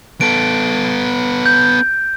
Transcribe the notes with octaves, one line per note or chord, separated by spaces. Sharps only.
B3 A4 D7
G6